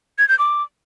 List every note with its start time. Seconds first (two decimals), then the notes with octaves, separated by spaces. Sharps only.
0.18 G#6
0.29 G6
0.39 D6